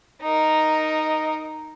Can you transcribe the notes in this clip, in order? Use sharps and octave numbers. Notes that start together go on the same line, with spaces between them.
D#4 A#4 D#5